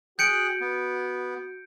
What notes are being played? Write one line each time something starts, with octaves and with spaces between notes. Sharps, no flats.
F#4 G#4 G5 F#6 G6 C#7 D7
B3